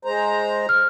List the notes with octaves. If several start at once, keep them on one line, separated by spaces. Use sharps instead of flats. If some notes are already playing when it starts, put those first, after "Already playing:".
G#3 C5 A#5
F6